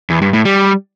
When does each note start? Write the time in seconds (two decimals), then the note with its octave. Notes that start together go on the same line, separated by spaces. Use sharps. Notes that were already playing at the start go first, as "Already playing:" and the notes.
0.10 E2
0.22 G2
0.33 A2
0.45 G3